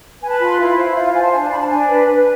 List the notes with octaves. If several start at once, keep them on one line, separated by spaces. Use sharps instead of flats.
B4 G#5
A5
F4 B5
C6
E4 F5
C5
F4 E5
F5
C5 G#5
A5
D4 G#5
A5
C5 B5
A5
D4 G#5
B4
B4